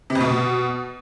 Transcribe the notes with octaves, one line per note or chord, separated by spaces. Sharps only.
C3
F2
B2